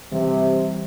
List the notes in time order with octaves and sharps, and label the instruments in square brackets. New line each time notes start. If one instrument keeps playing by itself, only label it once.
[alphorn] C3 [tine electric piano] E3 G3